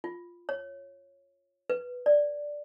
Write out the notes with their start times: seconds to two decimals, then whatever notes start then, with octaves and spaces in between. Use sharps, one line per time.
0.04 F4
0.49 C#5
1.70 B4
2.06 D5